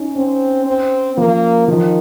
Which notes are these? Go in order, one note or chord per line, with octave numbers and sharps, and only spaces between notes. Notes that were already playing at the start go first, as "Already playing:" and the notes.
Already playing: C#4 D#4
C4 C#4
C4
F3 A#3
D#3 F3